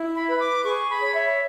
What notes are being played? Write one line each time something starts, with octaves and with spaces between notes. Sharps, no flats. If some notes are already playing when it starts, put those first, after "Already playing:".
Already playing: E4
B5
B4
D6
G#4 C#6
B5
C#5
E5